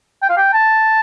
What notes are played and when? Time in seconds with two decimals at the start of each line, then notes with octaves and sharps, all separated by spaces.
0.22 G5
0.30 F5
0.37 G5
0.53 A5